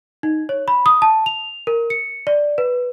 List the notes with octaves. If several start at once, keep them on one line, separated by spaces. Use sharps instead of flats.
D#4
C#5
B5
D#6
A5
F7
A#4
C#7
D5
B4